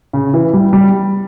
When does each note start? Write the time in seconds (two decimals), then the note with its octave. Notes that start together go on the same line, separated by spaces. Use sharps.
0.13 C#3
0.33 E3
0.53 G3
0.73 G3